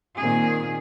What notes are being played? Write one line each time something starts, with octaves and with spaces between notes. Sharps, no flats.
A#2 D#3 C4 G#4